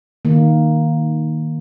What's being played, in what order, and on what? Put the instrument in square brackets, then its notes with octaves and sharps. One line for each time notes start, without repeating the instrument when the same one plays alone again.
[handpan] D#3 A#3